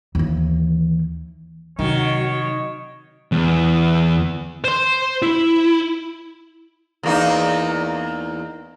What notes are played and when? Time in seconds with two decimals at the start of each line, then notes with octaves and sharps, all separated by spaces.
0.15 D#2 E3
1.79 C3 D#3 F#3 C#5
3.32 E2
4.64 C5 C6
5.22 E4
7.03 E2 A#3 D#4